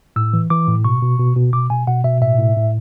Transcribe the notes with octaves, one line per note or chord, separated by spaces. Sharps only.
A2 E6
E3
E3 D6
A2
B2 C#6
B2
B2
B2
B2 D6
B2 G#5
B2 F#5
B2 E5
A2 E5
A2
A2